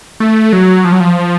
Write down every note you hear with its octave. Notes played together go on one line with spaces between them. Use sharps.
A3
F#3
F3
F#3
F3